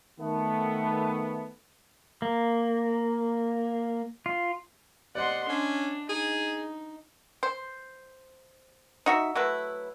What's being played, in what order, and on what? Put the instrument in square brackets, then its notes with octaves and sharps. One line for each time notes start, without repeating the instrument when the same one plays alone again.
[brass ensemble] D#3 A3 B3
[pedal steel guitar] A#3
F4
[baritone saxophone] C3 [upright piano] D5 D#5 [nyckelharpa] F#5 C6
[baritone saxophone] C#4 [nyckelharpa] D4
[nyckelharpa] D#4 [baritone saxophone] G#4
[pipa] C5
D#4 F#4 E5
F#3 A3 E4 B4